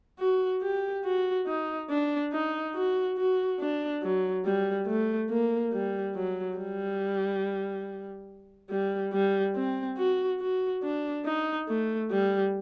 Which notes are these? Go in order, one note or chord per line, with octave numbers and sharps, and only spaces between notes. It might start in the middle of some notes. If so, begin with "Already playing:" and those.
F#4
G4
F#4
D#4
D4
D#4
F#4
F#4
D4
F#3
G3
A3
A#3
G3
F#3
G3
G3
G3
C4
F#4
F#4
D4
D#4
A3
G3